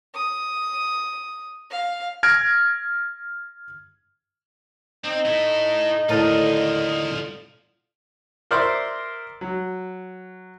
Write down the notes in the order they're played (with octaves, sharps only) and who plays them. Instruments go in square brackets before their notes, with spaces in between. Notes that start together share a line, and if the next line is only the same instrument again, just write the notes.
[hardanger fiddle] D#6
F5
[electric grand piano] F6 G#6 A#6 D7
[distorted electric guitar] C4 [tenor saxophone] D#4
[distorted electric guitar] E4 A4
[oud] D#2 D3 [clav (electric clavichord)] A2 A#4 A5 [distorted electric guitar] F4 D#5
[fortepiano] A#4 C5 D5 E5 C6 D6
F#3